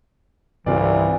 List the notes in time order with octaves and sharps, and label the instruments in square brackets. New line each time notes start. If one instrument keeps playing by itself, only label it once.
[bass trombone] C2 [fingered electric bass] G2 C#3 C4 [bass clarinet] E3 [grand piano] F4 D5